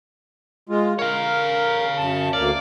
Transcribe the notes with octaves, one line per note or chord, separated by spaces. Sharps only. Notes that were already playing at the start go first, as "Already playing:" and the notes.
G#3 F4
A#4 C#5 F5
F#2 A5
D2 A#3 D5 F5